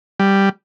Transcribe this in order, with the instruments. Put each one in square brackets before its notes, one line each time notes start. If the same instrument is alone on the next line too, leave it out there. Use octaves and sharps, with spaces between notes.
[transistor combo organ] G3